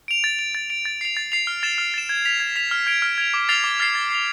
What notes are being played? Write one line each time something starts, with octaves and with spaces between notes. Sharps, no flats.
D7 F7
A6
D7 F7
A6
D7 F7
A6
C7 F7
A6
C7 F7
F6
A6 E7
F6
A6 E7
G#6
B6 F7
G#6
B6 F7
F6
G#6 D7 F7
F6
G#6 D7 F7
D6
F6 A6 C7 F7
D6
F6 A6 C7 F7
A6
C7 F7